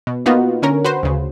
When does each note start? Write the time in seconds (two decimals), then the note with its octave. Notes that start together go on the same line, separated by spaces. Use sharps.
0.07 B2
0.26 A#3 B3 D#4 F4 F#4
0.62 D3 C#4 A#4
0.85 F#4 B4 C5
1.03 D2 C#3